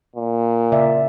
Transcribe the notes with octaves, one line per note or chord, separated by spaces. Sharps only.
A#2
C#3 D5 E5